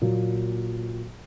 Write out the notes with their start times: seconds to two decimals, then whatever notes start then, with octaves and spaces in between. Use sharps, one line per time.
0.02 A#2 F#3 A#3